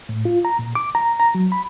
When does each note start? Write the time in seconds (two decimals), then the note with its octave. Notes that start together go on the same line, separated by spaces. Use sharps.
0.09 A2
0.25 F4
0.45 A#5
0.59 A#2
0.75 D6
0.95 A#5
1.20 A#5
1.35 F#3
1.52 B5